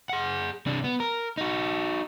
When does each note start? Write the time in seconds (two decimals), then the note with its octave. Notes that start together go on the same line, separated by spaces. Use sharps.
0.09 G#4 F#5
0.67 C3 D4
0.84 B3
1.00 A#4
1.38 D#4 F#4